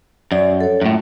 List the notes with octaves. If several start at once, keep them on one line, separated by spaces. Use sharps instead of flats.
F#2 D5
A4 C#5
F#2 A2 A3 A#3 F4